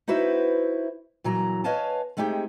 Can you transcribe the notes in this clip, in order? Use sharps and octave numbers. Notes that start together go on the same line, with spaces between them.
D#4 E4 F#4 B4 C5 E5
A#2 E3 F#3 A#5
B4 C#5 D#5 F5 G#5 A5
G#3 A3 C4 D#4 G4 G#4